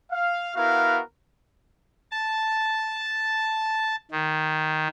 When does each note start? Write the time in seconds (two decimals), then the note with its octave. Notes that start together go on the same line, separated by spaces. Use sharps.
0.11 F5
0.55 B3 E4 F#4 A#4 F5
2.11 A5
4.11 D#3